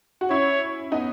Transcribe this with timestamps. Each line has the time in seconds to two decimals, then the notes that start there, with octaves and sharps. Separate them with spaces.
0.21 F#4
0.31 C#4 E4 C#5
0.92 B3 D#4